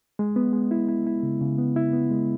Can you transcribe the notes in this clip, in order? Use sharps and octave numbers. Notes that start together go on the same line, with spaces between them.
G#3
B3
G#3
E4
E4
E4
C#3
C#3
B3
E4
B3
G#3